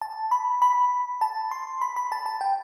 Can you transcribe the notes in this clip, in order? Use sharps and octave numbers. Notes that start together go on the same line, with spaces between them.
A5
B5
B5
A5
C6
B5
B5
A5
A5
G5